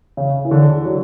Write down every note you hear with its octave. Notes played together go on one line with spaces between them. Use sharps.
C#3
E3
D3
F#3